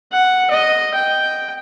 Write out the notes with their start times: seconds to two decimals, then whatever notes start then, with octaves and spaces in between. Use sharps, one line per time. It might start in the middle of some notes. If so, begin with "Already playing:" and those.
0.12 F#5
0.51 D#5
0.94 G5